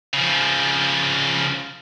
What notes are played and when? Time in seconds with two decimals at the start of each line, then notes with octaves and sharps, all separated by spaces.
0.13 C#3 F3